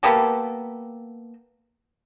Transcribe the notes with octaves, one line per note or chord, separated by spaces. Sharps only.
A#3 B3 G4 A4